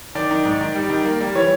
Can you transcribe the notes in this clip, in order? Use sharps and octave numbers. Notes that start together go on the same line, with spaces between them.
D#3 D5
D#3
G#2
D#3
G3
D#3
A#3
G3
E3 C#5